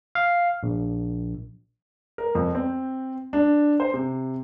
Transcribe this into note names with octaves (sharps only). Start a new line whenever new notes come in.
F5
A#1
A#4
F2
C4
D4
C5
C3